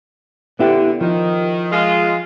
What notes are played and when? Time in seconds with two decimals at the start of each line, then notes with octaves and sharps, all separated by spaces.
0.59 D3 B3 E4 G4
1.01 D#3 F3
1.71 G#3 F4